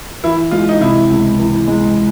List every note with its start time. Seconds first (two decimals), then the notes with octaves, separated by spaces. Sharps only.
0.24 E3 E4
0.51 G#3 F4
0.69 D#4
0.80 C3 E4
1.10 C#2
1.39 E3
1.68 G#3